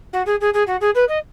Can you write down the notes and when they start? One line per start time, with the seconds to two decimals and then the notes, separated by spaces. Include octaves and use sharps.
0.13 F#4
0.26 G#4
0.41 G#4
0.54 G#4
0.67 F#4
0.81 G#4
0.95 B4
1.08 D#5